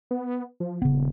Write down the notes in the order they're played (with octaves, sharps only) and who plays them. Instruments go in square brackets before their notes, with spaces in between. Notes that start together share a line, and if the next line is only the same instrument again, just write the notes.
[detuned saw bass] B3
F3
[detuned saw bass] D#1 [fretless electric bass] C#3 B3